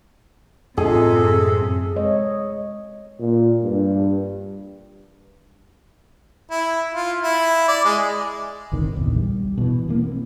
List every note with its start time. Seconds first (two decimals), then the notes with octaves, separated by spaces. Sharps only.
0.78 F#2 A2 C3 G#4 A4
1.96 G#3 C#5 D#5
3.20 A#2
3.63 G2
6.51 E4
6.94 F4
7.23 E4
7.68 D5
7.85 G#3
8.72 G1 C#2 C3 D#3
8.96 A#1 E2
9.16 G3
9.58 B2 E3
9.89 E3 A#3
10.03 C4